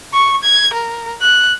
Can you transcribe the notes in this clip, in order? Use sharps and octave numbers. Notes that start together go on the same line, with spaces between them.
C#6
G#6
A#4
F#6